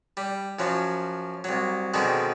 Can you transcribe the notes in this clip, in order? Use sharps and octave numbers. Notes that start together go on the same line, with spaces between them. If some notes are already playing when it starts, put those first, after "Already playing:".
G3
F#2 F3 F#3
C2 F#3
B2 D3 D#3 G#3 C4